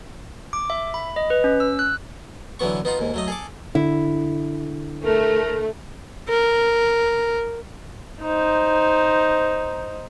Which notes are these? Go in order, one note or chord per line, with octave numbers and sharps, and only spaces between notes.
D6
E5
B5
D#5
B4
C#4
E6
F#6
D3 E3 F#3 B3 C#6
B3 D#4 F4 F#5
D#2 G#2
F#3 A3 D#5
G#4 A4 D6
D3 E4
A3 A#4
A#4
D#4 C5